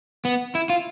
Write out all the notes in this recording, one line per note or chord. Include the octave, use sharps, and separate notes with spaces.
B3
E4
F4